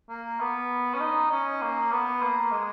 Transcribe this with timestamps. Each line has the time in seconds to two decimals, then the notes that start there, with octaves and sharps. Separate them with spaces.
0.09 A#3
0.40 B3
0.95 C#4
1.00 D#4
1.31 C#4
1.62 A#3
1.92 B3
2.22 A#3
2.52 G#3